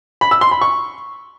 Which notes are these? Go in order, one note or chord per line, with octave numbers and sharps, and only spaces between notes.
B5
E6
C6
B5
C#6